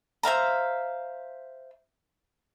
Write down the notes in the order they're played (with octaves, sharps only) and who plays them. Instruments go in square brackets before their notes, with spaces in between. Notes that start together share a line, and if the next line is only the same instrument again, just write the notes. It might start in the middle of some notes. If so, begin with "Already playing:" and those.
[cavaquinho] C5 E5 F5 A#5